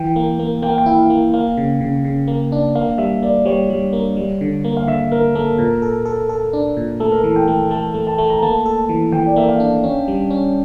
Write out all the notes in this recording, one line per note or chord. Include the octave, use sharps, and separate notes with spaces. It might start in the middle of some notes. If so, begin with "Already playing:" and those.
Already playing: E3 G5
A#3
A#3
A#3 G5
F5
G5
E4
F5
A#3
A#3 F5
C#3
C#3
C#3
A#3
D4
A#3 F5
G3 E5
A#3 D5
G3 C#5
G3
A#3
G3
D3
A#3
F5
D3 E5
A#3 A#4
A#3 A4
A#2 A#4
A4
A4
A4
D4
A#2
A3 A4
A#4
E3 A4
G5
A3
A3 A5
A3
A5
A3
A#5
A#3 A5
A4
A5
E3
E3 G5
D5
A#3 E5
F5
D4
C#4
G3
C#4